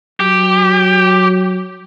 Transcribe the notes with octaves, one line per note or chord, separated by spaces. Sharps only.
F#3 G4